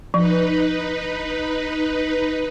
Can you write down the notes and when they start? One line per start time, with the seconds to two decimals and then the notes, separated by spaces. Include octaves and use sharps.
0.14 F3 D#4 B4